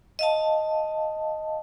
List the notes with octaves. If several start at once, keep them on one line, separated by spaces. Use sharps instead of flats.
D#5 F5 A5